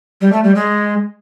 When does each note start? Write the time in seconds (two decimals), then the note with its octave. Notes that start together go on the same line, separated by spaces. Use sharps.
0.21 G3
0.32 A3
0.44 G3
0.55 G#3